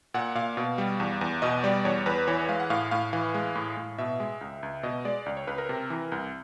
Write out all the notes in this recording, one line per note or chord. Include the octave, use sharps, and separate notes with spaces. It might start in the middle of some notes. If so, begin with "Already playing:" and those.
A#2 F#5
A#2 F5
B2
G3
E2
E2
B2 D#5
G3 D5
E2 C#5
E2 B4
E3 C#5
G#3 F5
F#5
A2 F5
A2 F5
E3 F5
G#3
A2
A2
B2 E5
G#3
C#2
C#2
B2 D#5
G#3 D5
C#2
C#5
C#2 B4
A#4
C3
E3
C2